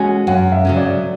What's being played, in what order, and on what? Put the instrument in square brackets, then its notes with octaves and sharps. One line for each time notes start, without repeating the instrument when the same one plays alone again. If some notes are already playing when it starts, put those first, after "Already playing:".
Already playing: [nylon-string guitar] G#3 C#4 F#4 [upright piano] F#5 G#5
[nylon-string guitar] F#2 [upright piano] F#5
[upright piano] E5
[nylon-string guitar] C#3 F#3 C#4
[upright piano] D5